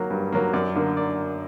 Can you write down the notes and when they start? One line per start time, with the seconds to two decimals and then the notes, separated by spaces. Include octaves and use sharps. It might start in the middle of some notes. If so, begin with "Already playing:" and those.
Already playing: F#3 A#3
0.10 G2
0.32 F#3 A#3
0.54 F#2 D5
0.75 D3 A#3
0.97 D5